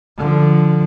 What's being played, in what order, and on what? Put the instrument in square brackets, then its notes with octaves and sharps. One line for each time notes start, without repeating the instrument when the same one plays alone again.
[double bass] D3 F3